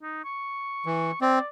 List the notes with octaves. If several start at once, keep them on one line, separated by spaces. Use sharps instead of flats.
D#4
C#6
E3
C4 D5